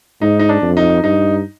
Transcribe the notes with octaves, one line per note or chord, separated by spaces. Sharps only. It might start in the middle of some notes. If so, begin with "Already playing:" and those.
G#2 D#4
D#4
D4
F2
D#4
G2 D#4